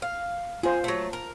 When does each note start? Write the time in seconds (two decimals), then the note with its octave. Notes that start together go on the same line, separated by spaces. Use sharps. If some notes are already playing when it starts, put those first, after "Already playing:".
0.02 F5
0.63 F4 G#4 C5
0.84 F#3 A3
1.13 A#4